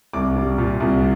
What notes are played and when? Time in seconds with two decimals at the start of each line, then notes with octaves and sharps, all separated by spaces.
0.13 C2 D6
0.36 G3
0.58 A#2
0.80 C2